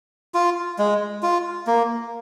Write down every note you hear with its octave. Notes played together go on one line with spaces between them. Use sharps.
F4
G#3
F4
A#3